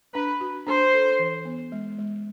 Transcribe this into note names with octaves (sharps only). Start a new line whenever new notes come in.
D4 B4
F#4
D4 C5
A4
E3
B3
G#3
G#3